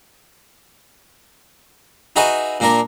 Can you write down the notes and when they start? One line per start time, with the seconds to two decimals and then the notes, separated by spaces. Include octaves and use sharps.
2.16 D#4 F#4 G#4 B4 D#5 E5
2.60 A#2 A#3 D4 A#4